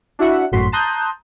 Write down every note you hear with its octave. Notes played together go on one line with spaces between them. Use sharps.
D4 E4 F#4 E5 F#5
G#1 F#2 A2 F#4 C6 B6
A5 A#5 C6 D#6 F#6 G6